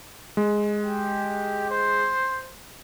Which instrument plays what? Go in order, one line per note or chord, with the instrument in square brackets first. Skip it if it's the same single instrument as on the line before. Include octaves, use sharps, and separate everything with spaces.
[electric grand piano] G#3
[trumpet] G4
C5